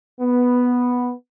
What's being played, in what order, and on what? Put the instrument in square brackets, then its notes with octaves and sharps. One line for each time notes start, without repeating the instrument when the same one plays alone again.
[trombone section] B3